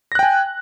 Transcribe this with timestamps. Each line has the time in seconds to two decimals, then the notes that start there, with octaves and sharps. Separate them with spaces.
0.12 A#6
0.15 F#6
0.19 G5
0.23 G#5